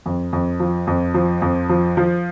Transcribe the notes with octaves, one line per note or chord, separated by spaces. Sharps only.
F2
F2
F3
F2
F3
F2
F3
F3